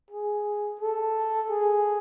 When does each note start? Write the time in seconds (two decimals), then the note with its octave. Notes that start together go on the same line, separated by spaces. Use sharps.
0.11 G#4
0.81 A4
1.50 G#4